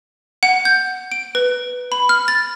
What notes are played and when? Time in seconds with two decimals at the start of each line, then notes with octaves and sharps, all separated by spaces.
0.43 F#5
0.65 G6
1.12 D7
1.35 B4
1.92 B5
2.09 F6
2.28 A6